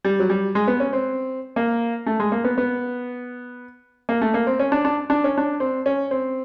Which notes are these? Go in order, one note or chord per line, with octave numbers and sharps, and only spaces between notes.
G3
F#3
G3
G#3
B3
C#4
C4
A#3
A3
G#3
A#3
B3
B3
A#3
A3
A#3
C4
C#4
D4
D4
D4
C#4
D4
C4
C#4
C4